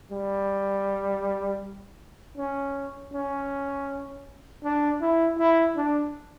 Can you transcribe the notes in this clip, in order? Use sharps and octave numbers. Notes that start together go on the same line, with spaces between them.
G3
C#4
C#4
D4
E4
E4
D4